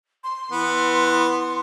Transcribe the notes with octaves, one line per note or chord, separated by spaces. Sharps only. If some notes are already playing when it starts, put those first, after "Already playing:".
C6
E3 B3